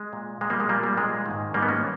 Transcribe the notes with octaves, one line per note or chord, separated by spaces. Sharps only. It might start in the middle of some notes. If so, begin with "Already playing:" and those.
Already playing: G#3
A#2
A#2 G#3
G3 A#3
G#3
A#2 G3 A#3
G3 A#3
A#2 G#3
G#2 D#3
G#2 D#3 G3 A#3
B3
A#3 C#4